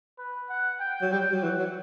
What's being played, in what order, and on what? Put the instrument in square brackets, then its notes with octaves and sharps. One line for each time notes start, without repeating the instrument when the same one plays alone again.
[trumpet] B4
F#5
G5
[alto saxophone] F#3
[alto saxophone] G3 [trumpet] G5
[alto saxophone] F#3
[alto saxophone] E3 [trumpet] F#5
[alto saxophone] F#3